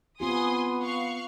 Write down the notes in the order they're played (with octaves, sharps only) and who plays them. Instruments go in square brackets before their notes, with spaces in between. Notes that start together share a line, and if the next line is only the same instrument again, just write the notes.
[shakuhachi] B3 [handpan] C4 F4 G4 [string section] G#5 C6 D#6
[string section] F5 C#6 F#6